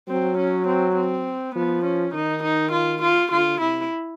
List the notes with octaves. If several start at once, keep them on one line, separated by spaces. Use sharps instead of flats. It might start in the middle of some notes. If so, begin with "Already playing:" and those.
F#3 C4
C#4
C4
C4
F3 B3
C#4
D#3 D#4
D#4
F4
F4
D3 F4
C3 E4